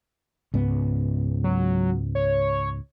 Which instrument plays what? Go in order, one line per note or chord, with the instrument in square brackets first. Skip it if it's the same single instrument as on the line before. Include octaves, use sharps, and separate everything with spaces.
[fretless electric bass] C#2 G#2 B3
[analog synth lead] F#3
C#5